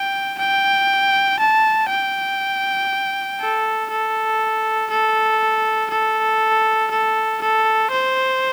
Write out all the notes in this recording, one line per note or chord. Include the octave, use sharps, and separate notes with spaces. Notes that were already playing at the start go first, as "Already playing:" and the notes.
Already playing: G5
G5
A5
G5
A4
A4
A4
A4
A4
A4
C5